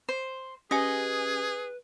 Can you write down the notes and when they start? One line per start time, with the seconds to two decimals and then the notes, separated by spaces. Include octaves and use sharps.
0.09 C5
0.71 C#4 G4 G#4 B4 D#5 G#5